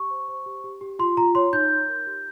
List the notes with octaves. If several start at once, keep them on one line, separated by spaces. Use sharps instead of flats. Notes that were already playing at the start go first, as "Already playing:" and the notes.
Already playing: G4 C#6
C5
C5
G4
G4
G4
F4 C6
F4 A#5
C#5 C6
D#4 G6
C#5
A#4
G4